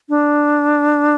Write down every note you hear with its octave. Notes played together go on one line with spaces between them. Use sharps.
D4